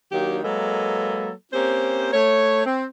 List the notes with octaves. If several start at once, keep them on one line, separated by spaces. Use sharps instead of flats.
D#3 F#3 A#3 D4 G4
F#3 G#3 A#3 A4 B4
A#3 C4 C#4 G4 C5
A3 C#5
C4